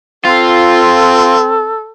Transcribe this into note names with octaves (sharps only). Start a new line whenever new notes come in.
C4 F4 A4